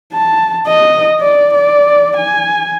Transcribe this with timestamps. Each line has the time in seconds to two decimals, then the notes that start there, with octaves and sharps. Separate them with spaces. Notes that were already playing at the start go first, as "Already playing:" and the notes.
0.13 A5
0.67 D#5
1.20 D5
1.54 D5
2.17 G#5